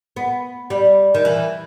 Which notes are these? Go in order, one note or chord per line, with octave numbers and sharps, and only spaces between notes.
B3
G3
D#3
E3